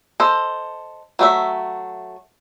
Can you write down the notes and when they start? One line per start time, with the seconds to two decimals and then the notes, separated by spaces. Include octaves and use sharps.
0.20 A4 C5 D#5
1.19 F#3 A3 E5